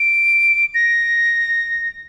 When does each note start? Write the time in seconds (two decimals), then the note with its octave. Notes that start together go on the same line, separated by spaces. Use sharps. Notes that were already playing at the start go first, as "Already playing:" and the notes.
Already playing: D7
0.75 A#6